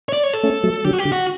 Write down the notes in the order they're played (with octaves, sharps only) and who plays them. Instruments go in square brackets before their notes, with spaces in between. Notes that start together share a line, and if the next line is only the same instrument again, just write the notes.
[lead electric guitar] C#5
D5
C#5
A4
[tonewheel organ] A3 C#4
F#3 A3
[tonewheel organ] D3 F#3 [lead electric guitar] G4
[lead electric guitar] F#4
G4
[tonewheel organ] D3
[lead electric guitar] F#4